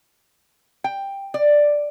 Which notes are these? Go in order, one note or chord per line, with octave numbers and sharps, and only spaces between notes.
G5
D5